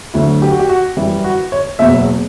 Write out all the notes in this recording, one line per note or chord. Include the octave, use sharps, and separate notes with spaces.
D2 D3 F#3 E4
G4
F#4
G4
F#4
F#2 E3 G3 E4
F#4
C#5
F#1 E2 B2 F#3 E5